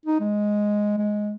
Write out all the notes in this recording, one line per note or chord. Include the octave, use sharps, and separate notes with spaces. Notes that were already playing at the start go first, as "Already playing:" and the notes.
D#4
G#3
G#3